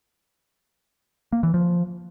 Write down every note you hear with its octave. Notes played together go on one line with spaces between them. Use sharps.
A#3
E3
F3